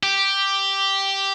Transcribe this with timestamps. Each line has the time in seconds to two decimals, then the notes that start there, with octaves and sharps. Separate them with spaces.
0.03 G4